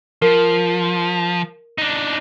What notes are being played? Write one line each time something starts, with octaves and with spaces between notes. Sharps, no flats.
F3 A#4
D4 D#4